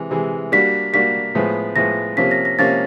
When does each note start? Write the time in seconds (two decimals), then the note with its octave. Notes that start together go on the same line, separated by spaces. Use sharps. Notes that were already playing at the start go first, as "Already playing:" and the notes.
Already playing: C3 E3 G#3
0.11 C3 E3 G#3
0.52 G3 A#3 D4 F#4 B6
0.93 G3 A#3 D4 F#4 B6
1.35 A2 F3 G#3 B3
1.76 A2 F3 G#3 B3 A#6
2.17 C3 F3 A#3 C#4 B6
2.31 A#6
2.45 A#6
2.59 C3 F3 A#3 C#4 A6